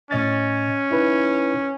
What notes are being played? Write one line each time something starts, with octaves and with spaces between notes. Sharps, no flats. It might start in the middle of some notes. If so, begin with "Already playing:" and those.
A2 C#4 D#5 A6
D#4 E4 B4